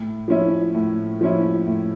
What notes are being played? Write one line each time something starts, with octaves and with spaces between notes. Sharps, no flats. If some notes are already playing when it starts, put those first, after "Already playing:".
Already playing: A2
F3 C#4 E4
A2
F3 C#4 E4
A2